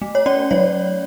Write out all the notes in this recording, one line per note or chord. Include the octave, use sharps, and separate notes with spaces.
A3
C#5
C#4 D5
F#3 C#5